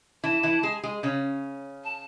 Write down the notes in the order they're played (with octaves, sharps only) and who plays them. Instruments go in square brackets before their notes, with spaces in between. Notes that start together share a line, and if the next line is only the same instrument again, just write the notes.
[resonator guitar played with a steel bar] E3 E4 [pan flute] A5
[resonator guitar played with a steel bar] E3 E4
G#3 G#4
G#3 G#4
C#3 C#4
[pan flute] A5